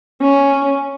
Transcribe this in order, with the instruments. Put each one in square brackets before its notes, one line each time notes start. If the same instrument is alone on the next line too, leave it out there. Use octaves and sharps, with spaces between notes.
[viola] C#4